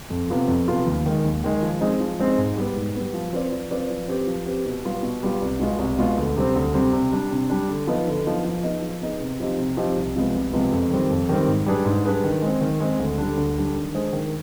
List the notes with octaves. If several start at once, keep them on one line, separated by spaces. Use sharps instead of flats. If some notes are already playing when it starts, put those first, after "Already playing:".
F2
C3 F3 B3 F4
F2
C3 F3 B3 F4
D#2
D#3 G#3
D#2
D#3 G#3
F3
G#3 C4 D#4 G#4
F3
G#3 C4 D#4 G#4
G#2
G3 B3
G#2
G3 B3
F3
C4 F4 B4 D5
F3
C4 F4 B4 D5
F3
C4 G4 B4
F3
C4 G4 B4
B2
G3 B3 F4
B2
G3 B3 F4
C2
B2 G#3 B3 F4
C2
B2 G#3 B3 F4
D2
C3 G3 C4
D2
C3 G3 C4
C3
G3 D4
C3
G3 D4
D3
F3 B3 D#4
D3
F3 B3 D#4
F3
B3 D#4 G#4
F3
B3 D#4 G#4
C3
F3 C4 D#4 G4
C3
F3 C4 D#4 G4
C2
C3 F3 G#3 B3
C2
C3 F3 G#3 B3
F2
D#3 G3 C4
F2
D#3 G3 C4
G#2
G3 D4 G#4 B4
G#2
G3 D4 G#4 B4
D#3
G#3 C4
D#3
G#3 C4
D2
D3 G3 D4
D2
D3 G3 D4
D#3
G#3 D4 G#4 C5
D#3